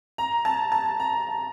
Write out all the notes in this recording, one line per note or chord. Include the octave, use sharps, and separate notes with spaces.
A#5
A5
A5
A#5